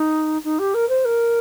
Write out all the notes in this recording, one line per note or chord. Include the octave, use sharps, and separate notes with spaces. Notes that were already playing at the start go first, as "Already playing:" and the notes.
Already playing: D#4
D#4
G4
A#4
C5
A#4